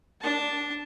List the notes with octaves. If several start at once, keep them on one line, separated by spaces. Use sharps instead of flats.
D4 A5